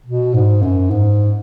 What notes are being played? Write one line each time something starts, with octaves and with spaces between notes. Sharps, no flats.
B2
G#2
F#2
G#2